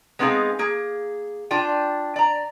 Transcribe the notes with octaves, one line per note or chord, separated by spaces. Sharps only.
G#3 B3 C4 D#4 G#4 F5
A#3 G#4
D4 F4 G5
D5 A#5